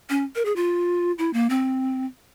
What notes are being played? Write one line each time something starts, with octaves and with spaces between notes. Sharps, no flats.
C#4
A#4
G#4
F4
E4
A#3
C4